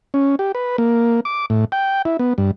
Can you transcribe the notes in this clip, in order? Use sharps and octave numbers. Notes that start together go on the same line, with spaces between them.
C#4
G4
B4
A#3
D6
A2
G5
E4
B3
G2